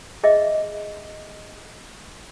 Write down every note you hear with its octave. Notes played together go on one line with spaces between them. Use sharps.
G#4 D#5 E5